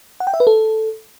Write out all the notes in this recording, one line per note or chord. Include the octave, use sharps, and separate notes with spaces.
F#5
G5
E5
B4
A4